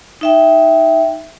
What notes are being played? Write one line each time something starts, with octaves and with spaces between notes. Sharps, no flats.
D#4 E5 G5